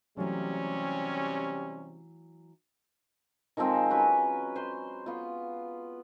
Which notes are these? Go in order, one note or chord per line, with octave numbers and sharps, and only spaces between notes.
C3 E3 F#3 G3 A3 C#4
D#3 F3 G#3 C4
F#3 C#4 B4
C5 C6
B3 F4